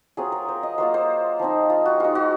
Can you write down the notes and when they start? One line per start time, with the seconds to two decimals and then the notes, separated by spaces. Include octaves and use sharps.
0.17 F#3 C4 F4 G#4
0.32 A#4
0.48 C5
0.63 D#5
0.78 F#3 A#3 F4 C5
0.94 C5
1.39 F3 C4 D#4
1.70 F4
1.86 F#4
2.00 G#3 D#4 F4
2.15 F#4